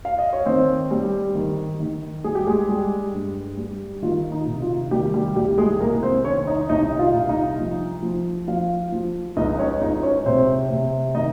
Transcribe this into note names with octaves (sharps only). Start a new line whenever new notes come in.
F5
D#5
C#5
D#3 C4 C5
G3
D#3
D#3
G3 G#4
G4
G#3 G#4
G3
G2
G3
D#3 F4
D#4
C3
F4
D#3 G3 G4
G3 G4
C2 G3 G4
G#3 G#4
C2 A#3 A#4
C4 C5
D#3 C#4 C#5
D#4 D#5
C2 D#4 D#5
F4 F5
C2
F5
D#4 D#5
F3
F3
F3 F4 F5
F3
C#2 D#4 D#5
C#4 C#5
C#2 D#4 D#5
C#4 C#5
C3 C4 C5
C3
D#3 D#4 D#5